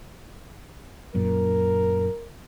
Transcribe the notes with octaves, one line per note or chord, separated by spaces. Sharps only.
F#2 A#2 A#4